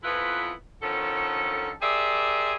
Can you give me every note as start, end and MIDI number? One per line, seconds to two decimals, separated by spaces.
0.03 0.51 41
0.03 0.51 52
0.03 0.51 59
0.03 0.51 64
0.03 0.51 65
0.03 0.51 71
0.82 1.72 50
0.82 1.72 51
0.82 1.72 53
0.82 1.72 61
0.82 1.72 69
1.82 2.56 67
1.82 2.56 68
1.82 2.56 70
1.82 2.56 72
1.82 2.56 74
1.82 2.56 76